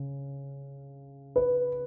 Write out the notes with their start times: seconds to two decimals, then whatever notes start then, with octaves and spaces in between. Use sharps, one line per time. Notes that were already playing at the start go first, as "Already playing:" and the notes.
Already playing: C#3
1.36 B4